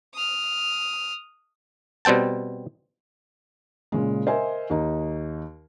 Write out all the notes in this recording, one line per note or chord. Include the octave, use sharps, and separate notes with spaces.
D#6 F6
B2 G3 C4 G5 A5
A#2 C#3 G#3
A#4 C5 D#5 E5 G#5
D#2 D#4 D#5